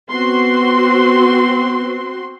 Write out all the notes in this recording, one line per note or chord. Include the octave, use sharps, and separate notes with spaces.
B3 C4 F#4 C6